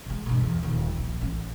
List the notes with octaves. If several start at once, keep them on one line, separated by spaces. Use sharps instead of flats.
C3 G#3
G2 B2
E2
D#1 D#2
A#1
A1 C#4